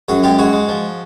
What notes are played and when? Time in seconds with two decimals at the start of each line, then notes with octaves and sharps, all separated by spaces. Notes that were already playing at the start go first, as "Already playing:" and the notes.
0.08 F#2 F#4 G#4
0.23 G#3 F4 G4
0.38 G#2 F#4 G#4
0.53 G#3
0.69 F3